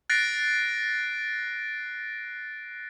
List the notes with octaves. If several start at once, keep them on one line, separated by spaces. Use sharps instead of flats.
F#6 A6 A#6 C7 D7